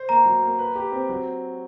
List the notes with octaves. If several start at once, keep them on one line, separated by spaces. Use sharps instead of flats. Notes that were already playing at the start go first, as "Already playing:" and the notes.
Already playing: C5
A#3 A#5
F#3
A#3
B4
G4
C4
F#3